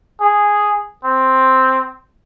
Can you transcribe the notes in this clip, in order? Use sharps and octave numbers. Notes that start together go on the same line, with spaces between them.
G#4
C4